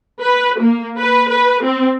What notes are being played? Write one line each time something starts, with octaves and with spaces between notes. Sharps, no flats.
B4
A#3
B4
B4
C4